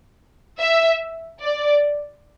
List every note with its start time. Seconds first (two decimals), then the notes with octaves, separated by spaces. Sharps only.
0.60 E5
1.43 D5